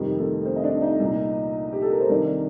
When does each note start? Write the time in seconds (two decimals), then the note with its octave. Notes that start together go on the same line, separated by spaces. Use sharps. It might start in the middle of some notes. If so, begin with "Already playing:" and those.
Already playing: F2 C3 D#3 G3 G4
0.18 A3 A4
0.45 C4 C5
0.56 D#5
0.64 D4 D5
0.82 D#4 D#5
1.00 C2 A#2
1.73 G4
1.82 A4
1.91 A#4
2.00 C5
2.09 C2 C3 D#3 D4 D5